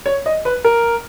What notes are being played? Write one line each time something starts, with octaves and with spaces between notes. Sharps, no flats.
C#5
D#5
B4
A#4